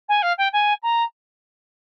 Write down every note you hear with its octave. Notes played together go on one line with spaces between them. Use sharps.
G#5
F5
G5
G#5
A#5